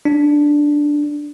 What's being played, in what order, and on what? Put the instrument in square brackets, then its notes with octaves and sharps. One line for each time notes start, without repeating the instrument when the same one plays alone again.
[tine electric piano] D4